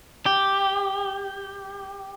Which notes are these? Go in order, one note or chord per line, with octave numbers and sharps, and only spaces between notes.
G4